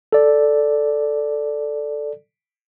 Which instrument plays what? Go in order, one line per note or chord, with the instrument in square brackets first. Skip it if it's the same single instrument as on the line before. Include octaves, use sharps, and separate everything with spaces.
[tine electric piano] A4 D5